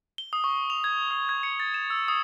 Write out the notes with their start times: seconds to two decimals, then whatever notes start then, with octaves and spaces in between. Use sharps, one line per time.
0.18 G7
0.33 D#6
0.44 C#6
0.70 F7
0.84 G#6
1.11 D#6
1.29 G#6
1.43 C#7
1.60 A6
1.74 E7
1.90 E6
2.08 D#6